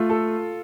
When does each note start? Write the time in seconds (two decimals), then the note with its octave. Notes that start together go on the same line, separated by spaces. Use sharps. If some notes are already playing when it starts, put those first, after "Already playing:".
Already playing: A3 F4
0.09 A4